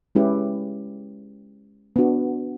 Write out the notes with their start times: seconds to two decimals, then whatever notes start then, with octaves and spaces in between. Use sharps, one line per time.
0.15 G#3 C#4 E4 G4 B4
1.96 B3 D4 F#4